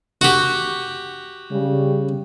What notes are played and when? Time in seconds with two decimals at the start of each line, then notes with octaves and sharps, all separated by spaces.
0.21 F#4 G4
1.51 C#3 G3